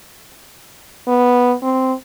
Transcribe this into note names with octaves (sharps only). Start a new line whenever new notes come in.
B3
C4